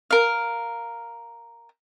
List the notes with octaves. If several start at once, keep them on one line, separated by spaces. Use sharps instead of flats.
A#4 F5